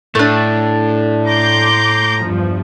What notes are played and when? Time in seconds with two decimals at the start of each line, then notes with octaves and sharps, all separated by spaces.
0.15 A2 A3 D4
1.26 A#5 C6 D6 G6
2.20 E2 G2 F3